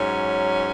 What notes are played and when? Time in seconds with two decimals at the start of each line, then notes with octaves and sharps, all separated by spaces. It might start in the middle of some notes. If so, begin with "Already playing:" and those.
Already playing: G#2 F#3 C#4